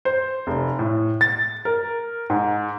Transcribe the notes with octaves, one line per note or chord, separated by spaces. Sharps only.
C5
F1
A2
A6
A#4
G#2